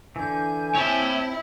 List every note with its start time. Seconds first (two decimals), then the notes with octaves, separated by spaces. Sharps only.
0.16 D3 E3 G#5 G6
0.75 C4 E4 C#5 G5 A5